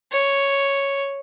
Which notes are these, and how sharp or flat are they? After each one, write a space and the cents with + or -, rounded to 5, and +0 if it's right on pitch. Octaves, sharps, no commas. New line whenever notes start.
C#5 +0